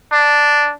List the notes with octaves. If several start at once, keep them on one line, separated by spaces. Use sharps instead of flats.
D4